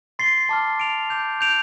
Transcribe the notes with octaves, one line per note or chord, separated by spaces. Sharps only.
C6 A6 C7 G7
A5 D6 F6
F6 D7 F7
D6 G6 F7
G6 D7 F7